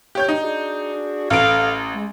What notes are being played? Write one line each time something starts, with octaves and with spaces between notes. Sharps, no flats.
G4 C#5 G6
D#4
D4 F#4 G#4
A1 A4 F5 D7
G#3